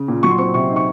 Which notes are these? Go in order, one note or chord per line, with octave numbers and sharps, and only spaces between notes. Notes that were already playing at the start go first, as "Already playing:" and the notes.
Already playing: C#3
A#2
F#3 C#6
C6
C4 C#6
C3 C#6
D#4
C#6